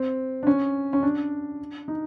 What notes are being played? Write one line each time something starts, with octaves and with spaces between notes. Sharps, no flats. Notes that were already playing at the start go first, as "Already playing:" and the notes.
Already playing: C4
D4
C#4
C#4
D4
D#4